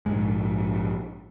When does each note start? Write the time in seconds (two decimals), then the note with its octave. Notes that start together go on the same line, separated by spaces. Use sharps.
0.06 A#1 G#2 G#3